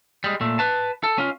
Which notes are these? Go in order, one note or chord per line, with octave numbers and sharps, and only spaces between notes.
G3 G#3
A#2 A3
B4 A5
A4
C#4 F4